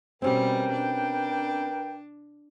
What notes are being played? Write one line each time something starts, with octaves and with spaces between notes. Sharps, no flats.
B2 G3 C4 C#4 G4 A#4 B4 G5
D4